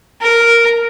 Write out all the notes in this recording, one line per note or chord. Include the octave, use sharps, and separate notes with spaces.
A#4